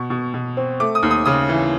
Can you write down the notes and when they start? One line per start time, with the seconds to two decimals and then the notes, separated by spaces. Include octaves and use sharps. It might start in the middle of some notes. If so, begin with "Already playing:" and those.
Already playing: B2 C#6
0.10 B2
0.34 B2
0.57 C4
0.80 A3 D6
0.95 D#6
1.03 D#2
1.11 D#6
1.25 C#3 D#6
1.49 E3